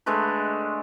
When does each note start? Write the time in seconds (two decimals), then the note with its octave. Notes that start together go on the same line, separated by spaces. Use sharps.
0.06 D3 G#3 A3 B4